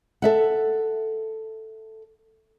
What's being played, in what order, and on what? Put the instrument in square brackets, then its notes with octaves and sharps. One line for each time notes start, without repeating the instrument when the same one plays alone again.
[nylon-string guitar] A4 E5 F#5